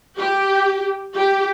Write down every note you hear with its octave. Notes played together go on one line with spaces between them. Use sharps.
G4
G4